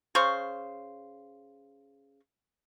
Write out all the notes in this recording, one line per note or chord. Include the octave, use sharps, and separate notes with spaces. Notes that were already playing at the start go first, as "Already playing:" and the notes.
C#3 C5 C#6